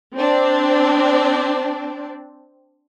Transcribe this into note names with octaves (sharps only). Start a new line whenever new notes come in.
C4 D4